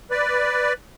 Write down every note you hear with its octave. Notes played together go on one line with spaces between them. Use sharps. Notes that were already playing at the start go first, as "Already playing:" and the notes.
B4 D5